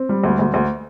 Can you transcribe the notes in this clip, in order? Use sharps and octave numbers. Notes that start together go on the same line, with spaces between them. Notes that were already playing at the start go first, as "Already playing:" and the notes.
Already playing: C4
G3
D2
D2
D2